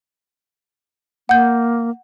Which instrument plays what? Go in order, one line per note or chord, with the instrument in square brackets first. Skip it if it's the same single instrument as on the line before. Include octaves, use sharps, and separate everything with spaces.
[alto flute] A#3 [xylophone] F#5 G6